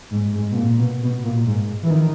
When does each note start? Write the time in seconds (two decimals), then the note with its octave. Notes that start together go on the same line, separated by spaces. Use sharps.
0.11 G#2
0.34 G#2
0.51 B2
0.56 A#2
0.78 B2
1.01 B2
1.23 A#2
1.45 G#2
1.83 E3
1.90 D#3